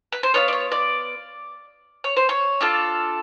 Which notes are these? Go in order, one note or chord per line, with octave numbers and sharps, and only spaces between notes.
B4
C5
B3 D4 F4 C#5
D5
C#5
D5
C#5
C5
C#5
D4 F4 A4